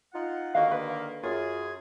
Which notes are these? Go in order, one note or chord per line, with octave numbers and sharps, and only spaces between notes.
D#4 F4 F#5
D3 D#3 A#3 F#4 D#5 F5
B4
F#2 F4 G#4